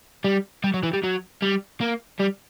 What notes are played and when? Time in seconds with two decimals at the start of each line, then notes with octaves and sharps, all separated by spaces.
0.24 G3
0.64 G3
0.74 F#3
0.83 E3
0.93 G3
1.03 F#3
1.42 G3
1.81 A#3
2.20 G3